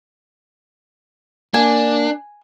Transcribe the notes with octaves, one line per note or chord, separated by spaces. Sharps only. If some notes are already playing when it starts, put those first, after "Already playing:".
A#3 D4 G#5